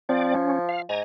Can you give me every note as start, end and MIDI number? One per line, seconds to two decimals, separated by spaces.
0.09 0.83 53
0.09 0.34 60
0.09 0.34 74
0.35 0.59 61
0.69 0.82 77
0.89 1.02 44
0.89 1.03 80
0.89 1.03 82